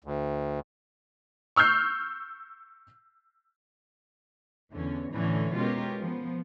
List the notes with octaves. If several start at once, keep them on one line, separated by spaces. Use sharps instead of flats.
D2
C#6 E6 F6 G6 C7
E2 D3 C#4
A2 D3 E3 C#4 E4
B2 G#3 C#4 F4 G4 A#4
F3 B3